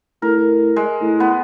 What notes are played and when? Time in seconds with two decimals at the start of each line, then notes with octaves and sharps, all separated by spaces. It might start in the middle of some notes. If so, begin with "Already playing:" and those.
0.22 A2 A#4
0.76 G#3
1.01 A2
1.20 B3